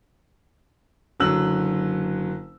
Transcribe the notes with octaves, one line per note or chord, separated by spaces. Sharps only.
F#1 D3 F#3 E6 F#7